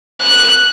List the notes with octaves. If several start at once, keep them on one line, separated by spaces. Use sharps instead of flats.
F#6